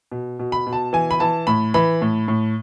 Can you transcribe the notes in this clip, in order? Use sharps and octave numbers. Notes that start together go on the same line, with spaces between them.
B2
B2
B5
B2
A5
E3 G#5
B5
E3 A5
A2 B5
E3 B5
A2
A2